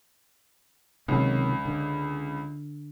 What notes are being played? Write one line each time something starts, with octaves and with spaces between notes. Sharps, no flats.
C#2 C3 D#3 F#3
D3